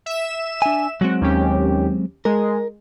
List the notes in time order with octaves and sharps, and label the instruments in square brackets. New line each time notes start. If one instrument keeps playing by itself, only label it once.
[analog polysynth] E5 E7
[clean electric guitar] D4 G#5
[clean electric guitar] F#3 G#3 C4 [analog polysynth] F#4
[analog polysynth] D#2 C#4 G4
[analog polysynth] G#3 [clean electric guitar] A#4